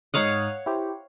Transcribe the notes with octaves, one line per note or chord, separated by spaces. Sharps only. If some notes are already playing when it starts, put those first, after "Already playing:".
G#2 D#4 C#5 F5 F#5 D#6
E4 G4 C5